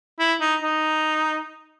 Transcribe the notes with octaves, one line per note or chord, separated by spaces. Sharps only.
E4
D#4
D#4